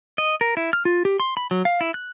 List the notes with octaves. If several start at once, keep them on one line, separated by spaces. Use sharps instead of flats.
D#5
A#4
E4
F6
F4
G4
C6
B5
F#3
F5
E4
F#6